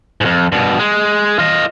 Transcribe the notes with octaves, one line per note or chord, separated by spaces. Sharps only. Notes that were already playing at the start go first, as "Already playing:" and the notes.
F2 G#2
G2 B2
G#3
F4 D#5